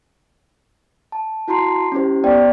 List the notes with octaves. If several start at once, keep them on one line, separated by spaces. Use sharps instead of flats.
A5
E4 F#4 A5 A#5 C6 C7
C#4 E4 G4 C5
B3 C5 D5 G5